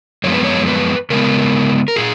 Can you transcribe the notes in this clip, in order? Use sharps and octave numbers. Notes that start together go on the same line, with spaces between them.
F#2 F3 G#3 B3 C#5
B4
C#5
B4
C#3 G#3 B3 A#4
A#4
A#2 G#4